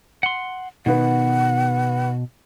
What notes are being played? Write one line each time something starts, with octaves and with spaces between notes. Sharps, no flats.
F#5 C6
B2 D#3 B3 F#5